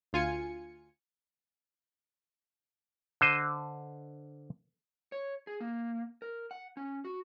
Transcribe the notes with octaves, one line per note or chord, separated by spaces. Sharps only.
D2 F4 G#5 C#7
D3 C5 D#5
C#5
G#4
A#3
A#4
F#5
C#4
F#4